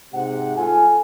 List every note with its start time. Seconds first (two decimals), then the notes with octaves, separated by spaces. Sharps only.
0.14 G#2 C3 F#5
0.57 A3 F4 G#5